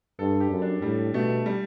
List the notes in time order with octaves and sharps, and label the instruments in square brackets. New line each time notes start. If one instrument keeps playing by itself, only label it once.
[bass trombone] G2 [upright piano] A4
[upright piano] G4
[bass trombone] F#2
[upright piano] D4
[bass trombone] A2 [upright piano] G3
[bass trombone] B2 [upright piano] A3
[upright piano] G3